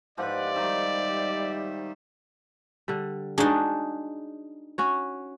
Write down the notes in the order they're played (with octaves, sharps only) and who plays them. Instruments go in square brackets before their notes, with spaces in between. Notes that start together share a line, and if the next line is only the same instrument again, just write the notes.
[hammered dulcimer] G#2 F3 G4 [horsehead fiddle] B4 F#5 [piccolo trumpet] D5
[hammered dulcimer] D#3 [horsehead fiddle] G3 E5
[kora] D3 G3
[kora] G#3 F#4 G#4 [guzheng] D4 D#4
[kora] C#4 F#4 C#5